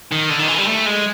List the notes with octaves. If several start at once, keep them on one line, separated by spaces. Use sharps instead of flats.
D#3
D3
D#3
E3
G3
A3
G#3